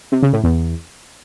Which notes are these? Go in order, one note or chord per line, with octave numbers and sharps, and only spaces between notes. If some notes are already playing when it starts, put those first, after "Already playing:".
C3
C#3
A2
E2